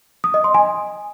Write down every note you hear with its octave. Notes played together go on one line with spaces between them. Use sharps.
D#6
D#5
C6
G#5